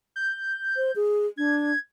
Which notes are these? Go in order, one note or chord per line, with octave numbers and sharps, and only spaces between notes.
G6
C5
G#4
D4 G#6